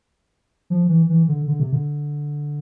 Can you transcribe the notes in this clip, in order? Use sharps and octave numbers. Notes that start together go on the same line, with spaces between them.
F3
E3
E3
D3
D3
C3
D3